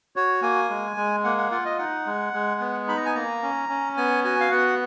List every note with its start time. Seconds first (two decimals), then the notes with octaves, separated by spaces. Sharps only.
0.16 F#4 C#5
0.42 A#3 G#5
0.70 G#3
0.97 G#3
1.24 A#3 F#5
1.38 F#5
1.51 F4 F#5
1.65 D#5
1.79 D#4 F#5
2.06 G#3
2.33 G#3
2.61 B3
2.88 D#4 B5
2.97 A#5
3.06 G#5
3.15 A#3 A#5
3.42 C#4
3.69 C#4
3.97 B3 G#5
4.24 F#4 G#5
4.40 F5
4.51 B3 F#5